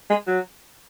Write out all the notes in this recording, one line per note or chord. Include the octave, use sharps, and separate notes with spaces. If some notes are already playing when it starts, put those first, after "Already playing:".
G#3
F#3